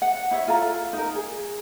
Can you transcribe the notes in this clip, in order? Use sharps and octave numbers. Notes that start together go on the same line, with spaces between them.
F#5
E4 C#5 E5
F4 A4 F5 A#5
D#4 A#4
G#4